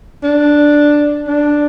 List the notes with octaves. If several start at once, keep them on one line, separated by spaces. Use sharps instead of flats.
D4
D4